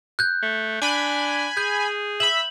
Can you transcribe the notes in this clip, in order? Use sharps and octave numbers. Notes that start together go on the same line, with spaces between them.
F#6 G6
A3
D4 G#5 B5
G#4 G6
E5 B5 F#7